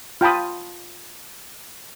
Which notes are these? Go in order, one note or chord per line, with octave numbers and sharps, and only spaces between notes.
F4 G5 A5 B5 D#6